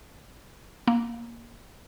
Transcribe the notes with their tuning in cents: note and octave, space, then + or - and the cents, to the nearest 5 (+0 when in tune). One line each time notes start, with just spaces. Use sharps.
A#3 +5